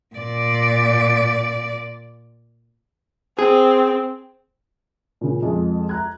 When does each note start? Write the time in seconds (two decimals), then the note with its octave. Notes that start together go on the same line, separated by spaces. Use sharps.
0.16 A#2 D5
3.39 C4 G#4
5.21 A#2 C#3
5.42 F2 G#3
5.89 A#5 F#6 G#6